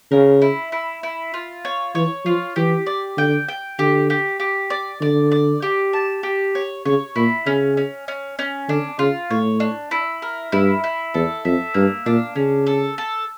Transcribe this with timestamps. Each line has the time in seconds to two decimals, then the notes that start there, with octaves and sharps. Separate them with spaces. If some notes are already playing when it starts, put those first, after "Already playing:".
0.12 C#3 A#4
0.42 E4
0.72 E4
1.03 E4
1.34 F4
1.65 C#5
1.95 E3 C#5
2.25 F3 F4
2.56 E3 G4
2.87 D5
3.17 D3 G5
3.48 G5
3.79 D3 G4
4.10 G4
4.40 G4
4.70 D5
5.01 D3 D5
5.32 D5
5.62 G4
5.93 A5
6.23 G4
6.55 C#5
6.85 C#3 C#5
7.16 A#2 E4
7.46 C#3 C#4
7.77 C#4
8.08 C#4
8.39 C#4
8.68 D3 D4
8.99 C#3 F4
9.30 A2 C#5
9.60 D4
9.91 E4
10.22 A#4
10.52 G2 E4
10.84 E4
11.14 E2 A4
11.45 F2 E5
11.74 G2 A#3
12.06 A#2 D4
12.36 C#3 C#4
12.67 A4
12.98 A4